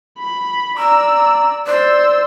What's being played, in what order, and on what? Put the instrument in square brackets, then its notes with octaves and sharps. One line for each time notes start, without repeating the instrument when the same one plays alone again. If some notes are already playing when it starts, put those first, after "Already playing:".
[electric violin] B5
[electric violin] D5 E6 [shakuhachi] A#5
[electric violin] C5 E6 [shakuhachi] D5